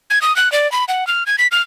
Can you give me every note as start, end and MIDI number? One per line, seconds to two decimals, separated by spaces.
0.10 0.21 92
0.22 0.35 87
0.36 0.51 90
0.52 0.70 74
0.72 0.84 83
0.88 1.07 78
1.07 1.24 89
1.26 1.36 92
1.38 1.47 95
1.51 1.62 89